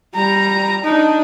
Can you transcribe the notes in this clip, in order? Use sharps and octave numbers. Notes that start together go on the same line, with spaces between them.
G3 A#5
D4 D#4